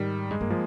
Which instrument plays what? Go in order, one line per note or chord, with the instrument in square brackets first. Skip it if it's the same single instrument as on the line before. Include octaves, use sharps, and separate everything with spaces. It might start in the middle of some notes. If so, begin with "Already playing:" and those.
Already playing: [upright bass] G#2 [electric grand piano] D#3 G3
[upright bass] G2 [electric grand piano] G#3
[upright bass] G2 [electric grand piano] A#3
[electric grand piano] F3 G#3